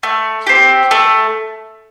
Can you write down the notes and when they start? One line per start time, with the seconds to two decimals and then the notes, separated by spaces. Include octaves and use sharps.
0.03 A3
0.47 C4 G4
0.91 A3